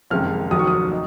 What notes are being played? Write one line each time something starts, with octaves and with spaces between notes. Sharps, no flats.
F#1 F2 C3 D#3 G#3 F6
F1 D#2 D#3 F#3 D#6
C#6
D#6
D#4